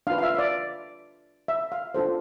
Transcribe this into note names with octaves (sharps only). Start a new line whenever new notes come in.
D4 F4 B4 F5
F5
E5
E5
D5
E5
F5
D4 F4 A4 C5